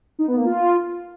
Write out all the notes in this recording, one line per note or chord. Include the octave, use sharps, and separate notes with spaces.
D#4
B3
A#3
F4